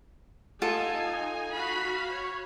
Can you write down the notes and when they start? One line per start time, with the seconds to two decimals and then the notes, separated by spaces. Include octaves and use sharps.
0.62 D#4 F4 A4 G#5
1.53 F#4 F5 B5
2.09 C#5